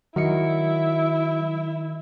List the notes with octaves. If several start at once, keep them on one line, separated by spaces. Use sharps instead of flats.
D#3 F#3 E4 D#5 C#7